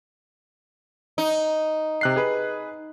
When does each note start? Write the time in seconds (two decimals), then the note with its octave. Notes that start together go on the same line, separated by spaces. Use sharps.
1.18 D#4
2.01 C3 F#6 C7
2.16 G#4 B4